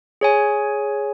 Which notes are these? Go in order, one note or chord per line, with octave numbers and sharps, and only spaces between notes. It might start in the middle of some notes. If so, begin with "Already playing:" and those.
G#4 C#5 G#5